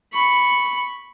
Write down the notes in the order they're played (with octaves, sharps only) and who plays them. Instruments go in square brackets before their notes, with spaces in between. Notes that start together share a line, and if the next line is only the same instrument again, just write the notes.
[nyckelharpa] B5 C#6